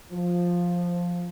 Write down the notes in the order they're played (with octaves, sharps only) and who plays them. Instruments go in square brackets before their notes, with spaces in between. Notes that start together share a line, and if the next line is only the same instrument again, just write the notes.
[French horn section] F3